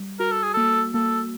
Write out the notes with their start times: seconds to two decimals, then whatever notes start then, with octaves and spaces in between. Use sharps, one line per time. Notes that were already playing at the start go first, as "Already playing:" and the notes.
Already playing: G3
0.20 F#4 A#4
0.31 A4
0.43 G#4
0.54 A#3 A4
0.94 A#3 A4